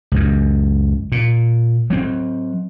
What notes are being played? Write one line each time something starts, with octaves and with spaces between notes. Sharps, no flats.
C#2 F#2
A#2
F#3 C4